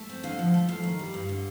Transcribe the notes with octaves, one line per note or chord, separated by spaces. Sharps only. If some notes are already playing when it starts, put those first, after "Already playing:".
Already playing: A3
C4
D3 F5
F3
A3
F2 F5
D#3
G3
G2
D3